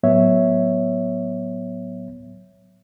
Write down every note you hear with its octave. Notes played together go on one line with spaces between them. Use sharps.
A2 F#3 B3 C#5 E5